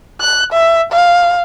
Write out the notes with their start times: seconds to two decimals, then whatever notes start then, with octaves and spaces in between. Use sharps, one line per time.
0.21 F#6
0.52 E5
0.92 F5